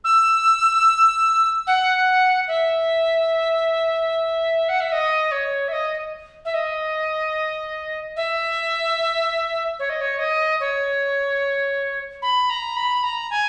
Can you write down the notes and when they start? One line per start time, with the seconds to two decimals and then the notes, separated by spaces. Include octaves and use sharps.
0.04 E6
1.67 F#5
2.47 E5
4.69 F#5
4.81 E5
4.92 D#5
5.32 C#5
5.68 E5
5.72 D#5
6.45 E5
6.54 D#5
8.16 E5
9.79 C#5
9.90 D#5
10.01 C#5
10.19 D#5
10.60 C#5
12.22 B5
12.50 A#5
12.76 B5
13.03 A#5
13.31 G#5